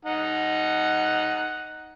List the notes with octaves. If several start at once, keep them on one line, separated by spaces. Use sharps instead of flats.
D#4 F#5